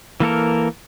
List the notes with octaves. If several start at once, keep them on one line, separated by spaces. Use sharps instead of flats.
E3 A#3 A4 A#4